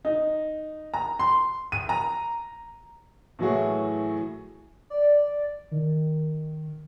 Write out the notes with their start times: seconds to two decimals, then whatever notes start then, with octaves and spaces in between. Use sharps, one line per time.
0.05 D#4
0.94 A#5
1.19 C6
1.72 D#7
1.89 A#5
3.39 A2 E3 F#3 A3 F#4 G#4
4.90 D5
5.71 D#3